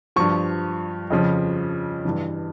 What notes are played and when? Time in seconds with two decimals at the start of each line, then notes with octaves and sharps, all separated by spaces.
0.16 G2 F3 C#6
1.10 F2 C#3 F3
2.05 G2 E3